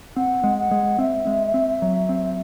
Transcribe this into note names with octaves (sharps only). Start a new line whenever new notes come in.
C4 F#5
G#3
F#5
G#3
C4 E5
G#3
C4
F#3
C4